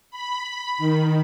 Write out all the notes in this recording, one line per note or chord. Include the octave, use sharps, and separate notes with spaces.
B5
D#3